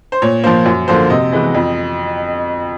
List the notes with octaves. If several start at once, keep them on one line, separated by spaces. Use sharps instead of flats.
C5
A#2 C#5
F3 A#3 C5
F#2
D3 F3 A#3 C5
C3 D#5
E3 G#3 B3
F2